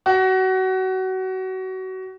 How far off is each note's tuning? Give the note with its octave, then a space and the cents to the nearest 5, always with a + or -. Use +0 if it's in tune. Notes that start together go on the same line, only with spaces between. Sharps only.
F#4 +25